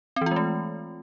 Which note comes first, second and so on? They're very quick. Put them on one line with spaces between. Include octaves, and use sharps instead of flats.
C4 E3 F4 G#3 A3